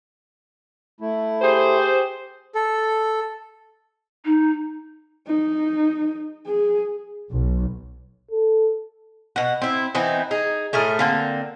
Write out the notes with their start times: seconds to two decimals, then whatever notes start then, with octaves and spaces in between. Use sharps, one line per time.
1.01 A3 E4
1.41 G4 G#4 C5
2.55 A4
4.25 D#4
5.27 D#4
6.47 G#4
7.30 B1
8.31 A4
9.36 B2 F#5
9.62 C4 E4
9.95 E3 B3 C4 D#4
10.31 D#4 G#4
10.73 A2 A3 G#4 A#4
10.99 D3 A#3 C4